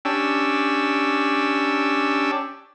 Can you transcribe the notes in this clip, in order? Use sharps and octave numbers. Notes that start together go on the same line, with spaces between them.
C#4 D4 G4 E6